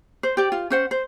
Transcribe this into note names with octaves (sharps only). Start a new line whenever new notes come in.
C5
G4 D5
F4
C#4 C5 F#5
C5